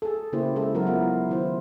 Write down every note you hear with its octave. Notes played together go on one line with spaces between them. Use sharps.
G#4 A4
C#3 A#3 E4 G4 C5
G#3 E4 A4
F#3 B3 E4 A#4
E4 F4
D#3 E4 C5